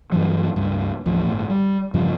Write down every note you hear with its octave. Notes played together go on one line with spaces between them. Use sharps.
G2 E3 F#3
C#2 G2
A1 D#2 F3
G1 A2
G3
E2 G2 C#3 F3